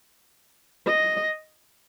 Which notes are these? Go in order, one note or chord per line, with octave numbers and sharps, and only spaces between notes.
D#5